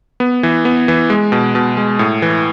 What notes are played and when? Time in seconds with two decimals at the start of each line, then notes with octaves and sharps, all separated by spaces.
0.20 B3
0.43 E3
0.65 B3
0.88 E3
1.10 G#3
1.32 B2
1.55 B2
1.77 G#3
1.99 A2
2.22 E3